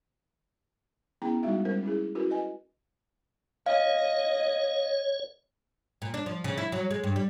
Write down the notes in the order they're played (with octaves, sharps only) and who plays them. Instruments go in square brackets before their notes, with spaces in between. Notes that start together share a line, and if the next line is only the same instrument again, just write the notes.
[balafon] B3 C#4 E4 G#4 G5 A#5
G3 G#3 D#4 F#4 E5 F5
G3 G#3 C#4 A#4 C5
C#4 E4 G#4
C#4 E4 F#4 A#4 B4
B4 D#5 G#5
[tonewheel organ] C#5 [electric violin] D#5 [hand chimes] F5
[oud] A#2
D4
F3
C#3
E4
F#3
G#3
G2
G3